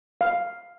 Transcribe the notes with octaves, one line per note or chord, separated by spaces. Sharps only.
F5